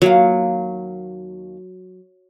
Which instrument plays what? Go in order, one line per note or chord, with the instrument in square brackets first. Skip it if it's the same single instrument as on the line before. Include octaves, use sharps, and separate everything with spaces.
[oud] D#2 A#3 F5 [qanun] F#3